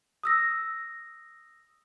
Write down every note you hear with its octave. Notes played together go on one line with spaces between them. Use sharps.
D#6 E6 A#6